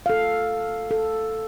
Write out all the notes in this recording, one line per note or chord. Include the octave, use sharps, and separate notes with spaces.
A4 F5
A4